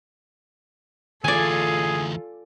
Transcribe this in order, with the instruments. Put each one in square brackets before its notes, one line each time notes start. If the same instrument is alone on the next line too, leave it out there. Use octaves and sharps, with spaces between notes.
[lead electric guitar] D2 E3 [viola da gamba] F4 A4 [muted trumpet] G#4 [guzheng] D5 G#5